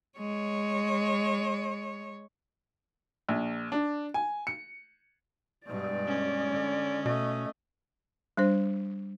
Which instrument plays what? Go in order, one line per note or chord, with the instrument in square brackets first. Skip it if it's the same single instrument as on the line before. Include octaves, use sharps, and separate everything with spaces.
[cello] G#3 C#5
[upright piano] A#1
D4
G#5
C#7
[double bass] G2 B2 [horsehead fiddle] G#3 D5
[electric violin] C#4
[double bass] D3
[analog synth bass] B2 [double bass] A3 [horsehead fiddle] D#5
[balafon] G3 D4 C5